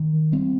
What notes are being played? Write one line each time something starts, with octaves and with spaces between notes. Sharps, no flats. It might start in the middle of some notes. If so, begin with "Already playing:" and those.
Already playing: D#3
G3 C4